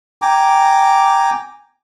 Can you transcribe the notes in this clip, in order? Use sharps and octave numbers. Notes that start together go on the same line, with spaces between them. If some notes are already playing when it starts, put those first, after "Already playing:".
G5 G#5 A#5 D6